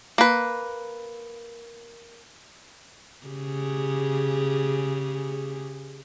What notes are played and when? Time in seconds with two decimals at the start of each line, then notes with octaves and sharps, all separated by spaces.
0.18 A#3 B4
3.27 C#3 G4 G#4